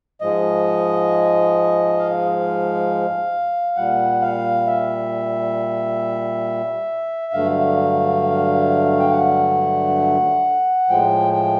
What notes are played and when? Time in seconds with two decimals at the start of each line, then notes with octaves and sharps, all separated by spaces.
0.21 G#2 F3 G#3 D#5
1.99 F5
3.77 A#2 G3 F#5
4.22 F5
4.67 E5
7.33 G2 D3 F#3 A3 F5
9.00 G5
9.11 F#5
10.89 A2 F3 G#3 G5
11.33 G5